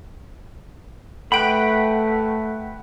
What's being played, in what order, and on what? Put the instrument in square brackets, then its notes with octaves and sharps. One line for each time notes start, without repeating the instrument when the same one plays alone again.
[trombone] A3 [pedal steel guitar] B4 B5 [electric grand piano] F#5 G5 D7